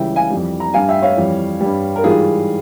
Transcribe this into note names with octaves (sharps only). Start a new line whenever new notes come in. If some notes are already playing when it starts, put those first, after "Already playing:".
Already playing: C#2 C#3 E3 G3 E5 G5
F5 G#5
F2 E3 G3
A#5
G2 G3 F5 G#5
E5 G5
C#5 F5
F2 E3 G3
G2 G3
A#4
G#2 E3 G3 F4 G#4